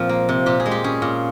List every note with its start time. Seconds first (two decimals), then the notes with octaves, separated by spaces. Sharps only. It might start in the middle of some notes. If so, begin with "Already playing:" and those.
Already playing: A#2 F3 C4
0.09 A#3
0.29 C3
0.46 A#2 G4
0.60 G#4
0.66 G#3
0.71 G4
0.84 C#4 G#4
1.02 A#2